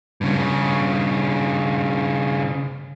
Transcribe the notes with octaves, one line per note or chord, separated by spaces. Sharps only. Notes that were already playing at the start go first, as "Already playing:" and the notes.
G2 C#3